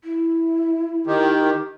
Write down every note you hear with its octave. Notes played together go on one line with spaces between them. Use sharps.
E4
D#3 G4